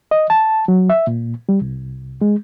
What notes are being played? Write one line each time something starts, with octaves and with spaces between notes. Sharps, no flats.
D#5
A5
F#3
E5
A#2
G3
C2
G#3